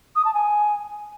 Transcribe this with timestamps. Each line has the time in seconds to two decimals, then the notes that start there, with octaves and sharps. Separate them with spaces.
0.16 D#6
0.25 A5
0.34 G#5